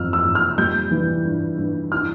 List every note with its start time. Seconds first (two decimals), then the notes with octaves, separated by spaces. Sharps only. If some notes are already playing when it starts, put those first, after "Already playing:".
Already playing: F2 E3 E6 F6
0.13 E6
0.24 F2
0.35 F6
0.58 G3 G6
0.91 E3
1.25 G2
1.58 G2
1.92 E4 F6